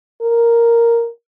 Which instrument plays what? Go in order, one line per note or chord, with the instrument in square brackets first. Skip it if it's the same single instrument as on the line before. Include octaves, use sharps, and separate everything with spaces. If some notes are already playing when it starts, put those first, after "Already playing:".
[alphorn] A#4